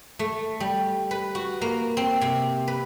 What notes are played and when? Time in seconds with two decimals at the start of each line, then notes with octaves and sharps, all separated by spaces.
0.19 A3
0.60 G3
1.11 B4
1.35 F#4
1.61 A#3
1.97 C4
2.21 C3
2.68 B4